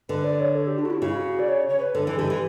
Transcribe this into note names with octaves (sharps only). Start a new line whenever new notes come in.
D3 B4
D5
C#5
A4
G4
D4
F#4
E4
C#3 F#4
D5
C#5
C#5
B4
D3 A4
E3
D3 G4
E3